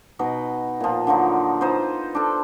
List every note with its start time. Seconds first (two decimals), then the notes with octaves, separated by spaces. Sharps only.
0.19 B2 D#4 B4 D#5
0.80 A#2 F3
1.07 D3 F3 F#3 D#4
1.61 D#4 F4 B4 C5
2.15 D4 A4